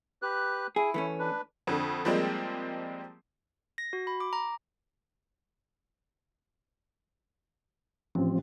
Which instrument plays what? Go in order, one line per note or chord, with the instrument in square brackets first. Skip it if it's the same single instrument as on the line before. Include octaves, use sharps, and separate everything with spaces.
[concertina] G4 B4 F#6
[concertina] E4 [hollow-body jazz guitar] G#4
[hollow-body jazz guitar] E3 A3 C#4
[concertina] D4 B4
[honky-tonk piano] F2 D3
F3 G3 G#3 A#3 C4
[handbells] A#6
F#4
B5
D6
A#5
[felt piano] A1 [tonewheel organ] F3 C4